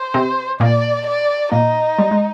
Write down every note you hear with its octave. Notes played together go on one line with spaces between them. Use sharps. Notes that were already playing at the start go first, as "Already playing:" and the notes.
Already playing: C5
C3 C4
A#2 A#3 D5
D5
A#2 A#3 D#4
G3
G#3